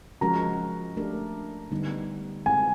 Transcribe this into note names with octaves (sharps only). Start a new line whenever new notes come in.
F3 G#3 C#4 F#4 A#4 A#5
A3 D4 G4 A#4
D3 G3 B3 D#4
G#3 C4 E4 G#4 G#5